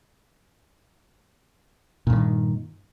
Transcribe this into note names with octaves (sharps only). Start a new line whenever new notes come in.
G2 A#2 D3 D#3